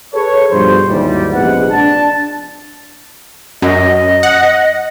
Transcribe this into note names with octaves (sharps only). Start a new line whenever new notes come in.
G#4 A4 B4 C#5
G2 B2 F3 C5
D#2 G#2 E3 F#3 G3
A#1 C3 G#3 B3 F#5
D4 A5
F#2 D#5
F#5